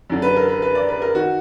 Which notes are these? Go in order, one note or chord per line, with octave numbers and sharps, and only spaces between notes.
F#2 D3
B4
A#4
B4
B4
D5
B4
A#4
D#3 F#4